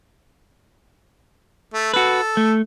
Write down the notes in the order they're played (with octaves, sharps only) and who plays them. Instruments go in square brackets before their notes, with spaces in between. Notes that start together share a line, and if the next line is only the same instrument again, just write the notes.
[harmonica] A3
[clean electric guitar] F#4 B4 [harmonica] A4
[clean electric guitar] A3